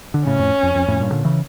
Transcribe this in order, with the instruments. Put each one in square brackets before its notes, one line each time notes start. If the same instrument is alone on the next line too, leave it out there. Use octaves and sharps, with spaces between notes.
[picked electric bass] D3
[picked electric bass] A2 C#3 [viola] C#4
[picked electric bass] F2 A2
F2
F2
F2 A2
G2 A#2
A#2 D3
C#3 E3